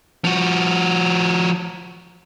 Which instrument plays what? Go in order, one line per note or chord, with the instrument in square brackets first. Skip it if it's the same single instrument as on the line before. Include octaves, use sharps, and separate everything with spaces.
[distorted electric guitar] F3 F#4